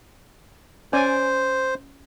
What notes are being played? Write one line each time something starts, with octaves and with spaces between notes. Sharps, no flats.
C#4 C5 D5 G#5